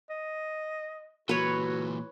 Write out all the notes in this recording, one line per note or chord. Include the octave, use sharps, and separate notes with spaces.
D#5
A#2 E3 F#4 B4 C#5